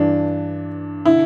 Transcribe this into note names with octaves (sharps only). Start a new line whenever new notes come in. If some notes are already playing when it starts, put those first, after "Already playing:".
Already playing: G2 E3 D4
D3 E4